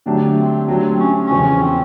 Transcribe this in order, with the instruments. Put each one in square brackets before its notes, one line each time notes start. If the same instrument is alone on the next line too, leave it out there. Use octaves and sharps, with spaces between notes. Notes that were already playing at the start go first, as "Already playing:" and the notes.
[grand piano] D3 F#3 A3 D4 G4
[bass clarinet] C4
[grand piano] F#3 A3 D4 G4 [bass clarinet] C4
[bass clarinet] C#4
C#4
[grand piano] E2 C#3 F3
[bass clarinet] C4